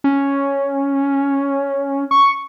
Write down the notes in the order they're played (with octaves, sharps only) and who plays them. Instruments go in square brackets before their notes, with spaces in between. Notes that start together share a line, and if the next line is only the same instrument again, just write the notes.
[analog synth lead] C#4
C#6